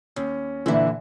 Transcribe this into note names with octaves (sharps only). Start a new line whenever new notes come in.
D#2 C#4
A#2 D3 E3 E4 E5